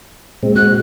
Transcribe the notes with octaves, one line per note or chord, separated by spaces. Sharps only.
A#2 G#3 C4
G#3 F#4 F#6